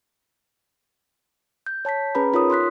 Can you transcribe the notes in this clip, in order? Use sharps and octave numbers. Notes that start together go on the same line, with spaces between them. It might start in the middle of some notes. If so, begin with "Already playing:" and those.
G6
C#5 A5 G6 B6
C#4 G#4 B4 A#5 B5
D#4 F4 A#4 C#5 D#6
C6 D#6 F#6 B6